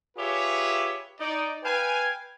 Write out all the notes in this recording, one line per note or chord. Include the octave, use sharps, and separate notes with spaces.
F4 G4 G#4 B4 C#5 E5
D#4 D5
B4 F5 G5 G#5